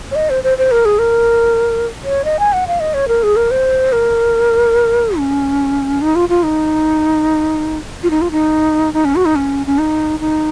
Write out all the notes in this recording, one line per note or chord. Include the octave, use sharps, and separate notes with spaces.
C#5
D#5
C5
C5
C5
A#4
G#4
A#4
C#5
D#5
G#5
F#5
F5
D#5
C#5
A#4
G#4
A#4
C5
A#4
C#4
D#4
F4
F4
D#4
F4
D#4
F4
D#4
D#4
C#4
F#4
D#4
C#4
C#4
D#4
D#4